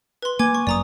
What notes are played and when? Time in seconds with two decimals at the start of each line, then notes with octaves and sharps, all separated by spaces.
0.22 B4 C6
0.39 A#3 G#5 D6 G#6
0.55 C#6
0.67 G1 F#2 D5 A#5 D#6